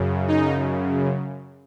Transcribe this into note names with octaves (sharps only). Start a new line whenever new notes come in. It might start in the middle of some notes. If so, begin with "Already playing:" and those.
Already playing: F#2 C#3
D#4